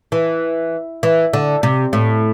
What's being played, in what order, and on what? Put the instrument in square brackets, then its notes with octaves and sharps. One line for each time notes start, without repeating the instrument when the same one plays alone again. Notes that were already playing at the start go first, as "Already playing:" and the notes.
[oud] E3
E3
D3
C3
A2